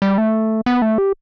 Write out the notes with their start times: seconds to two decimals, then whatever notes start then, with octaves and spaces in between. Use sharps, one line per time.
0.02 G3
0.18 A3
0.66 B3
0.82 A3
0.98 G4